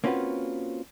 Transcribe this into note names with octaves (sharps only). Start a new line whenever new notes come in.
A#3 C4 C#4 F4 F#4 B4